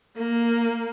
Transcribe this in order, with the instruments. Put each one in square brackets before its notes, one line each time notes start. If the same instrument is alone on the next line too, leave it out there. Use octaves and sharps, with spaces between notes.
[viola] A#3